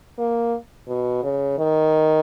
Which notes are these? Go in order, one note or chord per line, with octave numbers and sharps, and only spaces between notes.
A#3
B2
C#3
D#3